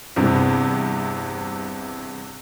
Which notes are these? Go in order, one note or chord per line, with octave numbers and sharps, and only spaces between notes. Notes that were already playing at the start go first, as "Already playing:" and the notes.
E2 G2 C3